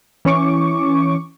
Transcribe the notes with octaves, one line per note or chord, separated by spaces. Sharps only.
E3 C#4 C#6 D6